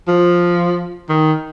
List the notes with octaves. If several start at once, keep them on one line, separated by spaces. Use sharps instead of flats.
F3
D#3